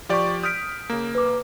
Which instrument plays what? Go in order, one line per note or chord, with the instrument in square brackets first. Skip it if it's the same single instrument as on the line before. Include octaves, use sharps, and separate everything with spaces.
[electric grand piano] F3 G4 D5 [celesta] C6 C#6
[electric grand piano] D#6 F6 B6 [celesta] G6 D7
[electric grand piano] C#3 A#3
[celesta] B4 D6